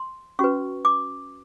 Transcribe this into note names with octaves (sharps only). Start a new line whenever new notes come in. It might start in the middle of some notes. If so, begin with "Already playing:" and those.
Already playing: C6
C#4 F#4 B4 C#6
D6